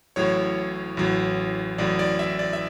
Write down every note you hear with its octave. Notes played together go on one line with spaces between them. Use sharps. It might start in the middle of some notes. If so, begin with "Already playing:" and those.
A1 A2 F#3 C#5
A1 A2 F#3
A1 A2 F#3 D5
D5
E5
D5
E5